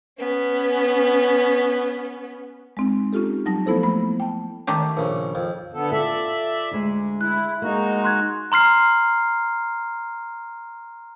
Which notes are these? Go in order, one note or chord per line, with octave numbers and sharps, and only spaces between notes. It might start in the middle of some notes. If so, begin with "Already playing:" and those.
B3 C#4
G#3 C4 D#4
C#4 D#4 F4 G4 A4
F#3 G3 D#4 A5 A#6
F3 A3 B3 E4 A4 C5
A3 A#3 B5
G5 A5
D#3 A3 G4
A#1 C#3
F2
D3 B3 A4
F4 A4 D5 E5
D2 G#3
E4 F#6
G#3 A#3 D#4 F#4
C6 F#6 G#6
A#5 C6 F6 C7